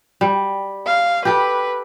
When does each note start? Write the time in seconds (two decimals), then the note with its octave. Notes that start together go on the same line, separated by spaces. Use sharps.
0.21 G3
0.86 F5
1.25 G4 A4 B4